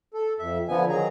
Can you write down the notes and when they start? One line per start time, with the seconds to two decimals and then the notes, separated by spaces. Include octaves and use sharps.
0.14 A4
0.39 F2 E5
0.69 D3 F3 B3 G#5
0.89 D#3 F#3 G#4 A#5